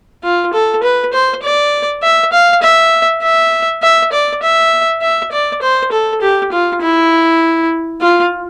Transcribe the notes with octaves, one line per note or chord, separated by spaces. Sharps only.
F4
A4
B4
C5
D5
E5
F5
E5
E5
E5
D5
E5
E5
D5
C5
A4
G4
F4
E4
F4